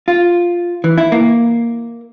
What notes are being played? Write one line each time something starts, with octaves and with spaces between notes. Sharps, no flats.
F4
E3
E4
A#3